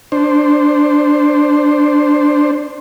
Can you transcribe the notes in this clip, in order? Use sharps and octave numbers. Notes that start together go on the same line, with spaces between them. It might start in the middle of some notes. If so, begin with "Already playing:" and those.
D4 C5